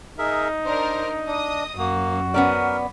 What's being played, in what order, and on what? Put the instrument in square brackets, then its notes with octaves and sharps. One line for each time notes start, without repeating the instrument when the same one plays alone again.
[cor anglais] D#4 [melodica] G#4 A#4 E5
[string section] D4 A#4 [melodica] C5
[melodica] D4 [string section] D#5 D#6
[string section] F#2 [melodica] A#3 [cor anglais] F#4
[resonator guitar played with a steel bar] B3 C#4 D5 [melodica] A#4